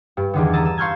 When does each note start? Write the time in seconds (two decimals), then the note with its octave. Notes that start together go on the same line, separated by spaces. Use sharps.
0.17 G2
0.33 E2 D3 D#3
0.53 A5 A#5 D#6 E6 A6
0.65 E6
0.78 F5 C6 C#6 F6 G6 G#6